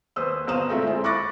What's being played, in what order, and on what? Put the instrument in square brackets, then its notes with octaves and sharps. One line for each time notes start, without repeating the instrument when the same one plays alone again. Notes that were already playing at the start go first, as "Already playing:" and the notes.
[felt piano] D#2 B4 C5 D#6 E6
G1 C5 F5 A#5 D#6 E7
G#3 A3 C4 F4 E5
E4 C5
B5 C#6 D6 F#6 A6 A#6